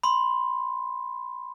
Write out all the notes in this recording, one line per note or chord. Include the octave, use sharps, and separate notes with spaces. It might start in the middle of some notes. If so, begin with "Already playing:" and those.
B5 C6